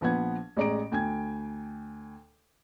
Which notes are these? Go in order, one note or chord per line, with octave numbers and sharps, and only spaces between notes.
A#1 F3 B3 B4 F#5 G#6
A1 G#3 D5 A#5 D7
D2 G5 G#5 G#6